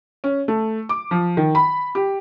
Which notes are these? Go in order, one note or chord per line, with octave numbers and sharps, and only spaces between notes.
C#4
A3
D6
F3
D#3
B5
G4